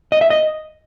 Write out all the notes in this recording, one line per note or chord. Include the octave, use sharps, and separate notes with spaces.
D#5
E5
D#5